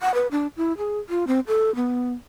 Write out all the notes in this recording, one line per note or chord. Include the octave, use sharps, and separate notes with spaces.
F#5
B4
D4
E4
G#4
F4
C4
A4
B3